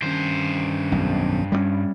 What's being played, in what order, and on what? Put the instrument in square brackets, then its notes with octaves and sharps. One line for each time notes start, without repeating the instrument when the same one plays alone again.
[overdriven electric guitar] G2 C5 [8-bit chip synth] D#3 C#4
[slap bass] B1 F2
G3 G#3 C#4